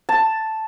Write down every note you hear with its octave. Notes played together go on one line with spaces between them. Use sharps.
A5